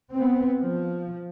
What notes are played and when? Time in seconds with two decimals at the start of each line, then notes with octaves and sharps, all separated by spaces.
0.14 B3 C4
0.61 F3